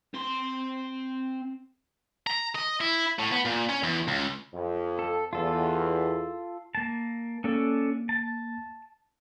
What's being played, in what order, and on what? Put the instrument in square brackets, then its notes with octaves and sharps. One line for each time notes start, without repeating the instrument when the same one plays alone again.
[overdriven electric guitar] C4 C6
[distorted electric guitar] A#5
D#5
E4
A2
B3
A#2
C#4
E2
C#2
[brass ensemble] F2
[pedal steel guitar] A4
[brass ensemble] E2 [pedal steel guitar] F4 A4
[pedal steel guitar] A#3 A5
[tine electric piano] A#3 [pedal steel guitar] C#4 D4 A4
[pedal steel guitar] A5